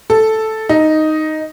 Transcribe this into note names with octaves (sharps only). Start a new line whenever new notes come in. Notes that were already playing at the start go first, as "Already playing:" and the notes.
A4
D#4